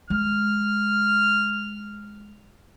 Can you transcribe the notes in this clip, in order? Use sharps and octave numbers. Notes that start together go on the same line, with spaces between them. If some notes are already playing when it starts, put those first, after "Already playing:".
G#3 F6